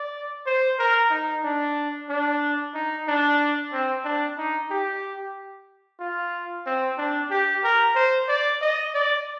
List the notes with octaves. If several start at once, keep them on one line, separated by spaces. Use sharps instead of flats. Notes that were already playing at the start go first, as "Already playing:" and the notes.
Already playing: D5
C5
A#4
D#4
D4
D4
D#4
D4
C4
D4
D#4
G4
F4
C4
D4
G4
A#4
C5
D5
D#5
D5